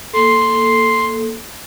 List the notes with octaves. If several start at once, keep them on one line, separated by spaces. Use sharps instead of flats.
A#3 A4 C6